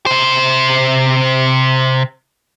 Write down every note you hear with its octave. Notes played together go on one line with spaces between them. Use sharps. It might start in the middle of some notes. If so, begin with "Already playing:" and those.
C3 C5